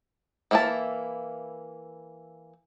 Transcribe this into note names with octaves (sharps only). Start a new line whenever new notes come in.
E3 A#3 E4 F#4 A5